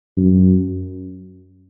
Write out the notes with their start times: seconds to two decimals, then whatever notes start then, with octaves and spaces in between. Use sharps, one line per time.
0.17 F#2